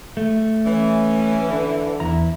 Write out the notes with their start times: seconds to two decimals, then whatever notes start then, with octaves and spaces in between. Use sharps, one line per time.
0.17 A3
0.66 E3 C#4
1.48 D3
2.00 E2 E4 A#5